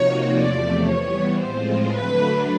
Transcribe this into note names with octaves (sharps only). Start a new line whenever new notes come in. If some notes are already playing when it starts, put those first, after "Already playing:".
Already playing: C3 F3 A#3 D#4 F#4 C#5
E2 C3 F3 A3 D5
E3 G3 B3 C#5
A2 F3 G#3 C4 F4 C5
D3 F#3 A3 D4 B4